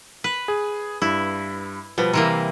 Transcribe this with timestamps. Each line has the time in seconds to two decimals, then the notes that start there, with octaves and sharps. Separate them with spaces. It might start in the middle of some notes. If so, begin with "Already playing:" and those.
0.24 B4
0.48 G#4
1.02 G2 E4
1.98 B2 F3 G3 B4
2.13 C3 E3 A#3 A#5